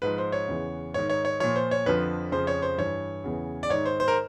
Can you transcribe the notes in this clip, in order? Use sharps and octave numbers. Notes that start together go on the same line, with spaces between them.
G#2 F3 B4
C5
C#5
E2 C#3 E3
G#2 D#3 C#5
C#5
C#5
A#2 F3 C#5
C5
C#5
F2 D3 F3 B4
F2 C#3 F3 C5
C#5
C5
G2 E3 C#5
E2 C#3 E3
D5
G#2 D#3 C#5
C5
C5
A#4